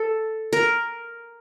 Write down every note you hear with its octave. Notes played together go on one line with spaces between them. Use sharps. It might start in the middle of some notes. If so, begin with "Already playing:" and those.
Already playing: A4
A#4